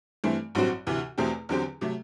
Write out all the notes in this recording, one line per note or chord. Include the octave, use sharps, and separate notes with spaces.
G2 E3 A3 C4
A1 G2 F#3 C4 F#4
D2 C3 E3
E2 B2 A3 C4 G4
E2 D3 F#3 C4 G4
C3 F#3 A3